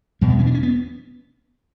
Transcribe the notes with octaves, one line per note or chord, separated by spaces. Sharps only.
E2 B2 G3
B3
C#4
D4
C#4
B3